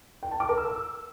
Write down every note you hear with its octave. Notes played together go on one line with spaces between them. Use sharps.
G5
A5
D6
A#4
E6